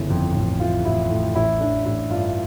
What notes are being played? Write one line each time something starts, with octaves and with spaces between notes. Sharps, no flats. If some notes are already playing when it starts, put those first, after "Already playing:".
Already playing: G1 C#3 E3
F2
A1
E3 F4
A1 E4
A2
A1 E4
E3 D4
A1 E4
G2 F4